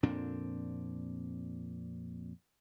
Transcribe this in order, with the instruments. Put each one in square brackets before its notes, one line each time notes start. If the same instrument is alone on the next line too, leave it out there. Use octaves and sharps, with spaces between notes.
[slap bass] F2 A#2 C4 D4